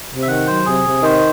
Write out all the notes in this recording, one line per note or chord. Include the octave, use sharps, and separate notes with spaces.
C3
E5
D#3 F#5
F#3 C5
C3 G#4
C3
D#3 C5